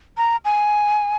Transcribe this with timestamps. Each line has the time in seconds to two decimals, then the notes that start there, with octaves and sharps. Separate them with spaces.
0.17 A#5
0.45 G#5